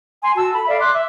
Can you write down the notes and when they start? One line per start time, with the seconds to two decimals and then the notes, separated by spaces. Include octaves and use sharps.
0.22 G#5 C6
0.35 F#4 A5 E6
0.52 A4 B5
0.67 A4 D5 E5 F5
0.79 C6 D6 F#6
0.94 E5